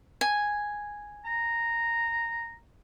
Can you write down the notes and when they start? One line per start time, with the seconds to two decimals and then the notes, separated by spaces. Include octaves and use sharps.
0.21 G#5
1.25 A#5